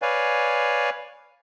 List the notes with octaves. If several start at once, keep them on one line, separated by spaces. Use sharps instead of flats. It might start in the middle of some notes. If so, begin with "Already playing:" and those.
B4 C#5 D5 F5 G#5